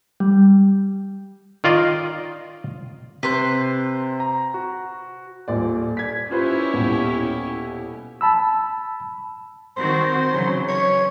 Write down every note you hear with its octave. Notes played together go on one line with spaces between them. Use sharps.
G3
D#3 F4 D5 D#5
C3 B4 C5
A#5
F#4
D#1 A#2 D5
G#6 B6
C#4 E4 F4 G4 B4 C5
D#1 B2
A5 B5 E6
D#3 C4 F#4 C5
C#3 E3 F#3
C#4 C#5